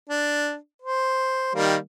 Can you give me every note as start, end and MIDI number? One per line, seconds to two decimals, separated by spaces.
0.09 0.55 62
0.82 1.54 72
1.55 1.76 51
1.55 1.76 55
1.55 1.76 58